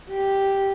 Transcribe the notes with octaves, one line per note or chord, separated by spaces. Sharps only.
G4